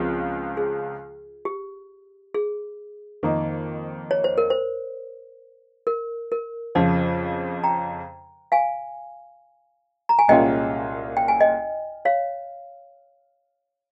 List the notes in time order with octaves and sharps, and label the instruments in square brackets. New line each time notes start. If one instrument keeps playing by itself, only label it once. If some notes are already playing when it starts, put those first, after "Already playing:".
Already playing: [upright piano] C#2 C#3 F3 G#3 C4 [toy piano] F4
[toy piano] G#4
G4
G#4
[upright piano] F2 D#3 A#3 D#4
[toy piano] C#5
C5
A#4
C5
A#4
A#4
[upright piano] F2 C#3 F3 [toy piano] C5
[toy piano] G5 A#5
F5 G#5
A#5
G#5
[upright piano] C2 A#2 G#3 C#4 F4 [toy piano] D#5 G5
[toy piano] G5
G#5
D#5 G5
C#5 F5